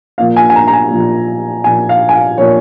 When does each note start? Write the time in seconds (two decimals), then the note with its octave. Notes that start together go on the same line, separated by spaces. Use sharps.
0.18 A#2 F3 A#3 F5
0.36 G#5
0.50 G#5
0.55 A#5
0.67 A#5
0.73 G#5
0.91 A#2 F3 A#3
1.64 A#2 F3 A#3 G#5
1.89 F5
2.09 G#5
2.13 F5
2.38 A#2 F3 A#3 C#5